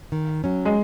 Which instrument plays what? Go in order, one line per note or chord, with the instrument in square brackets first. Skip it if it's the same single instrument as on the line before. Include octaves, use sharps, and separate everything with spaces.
[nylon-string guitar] D#3
F#3 C#4
[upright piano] G#3